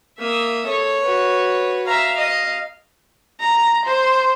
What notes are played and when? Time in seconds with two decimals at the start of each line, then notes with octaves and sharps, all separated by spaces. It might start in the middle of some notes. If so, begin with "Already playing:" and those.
0.19 A#3 E5 D#6
0.66 A4 C#5
1.03 F#4 B4
1.87 E5 F5 A#5
2.16 D#5
3.40 A#5
3.85 C5